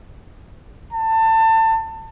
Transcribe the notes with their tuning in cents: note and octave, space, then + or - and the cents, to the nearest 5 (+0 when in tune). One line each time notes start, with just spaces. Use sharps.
A5 +25